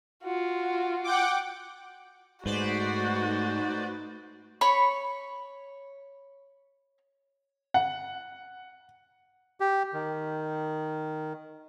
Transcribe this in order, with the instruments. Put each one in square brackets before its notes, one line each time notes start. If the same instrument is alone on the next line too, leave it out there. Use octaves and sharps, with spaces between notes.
[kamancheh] F4 F#4
[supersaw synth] F#5 G5 D6
[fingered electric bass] G#2 [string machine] A3 D#4 [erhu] F#4 [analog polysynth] B4 C5 D5
[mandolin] C#5 B5 C#6
[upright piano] F#5
[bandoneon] G4
D#3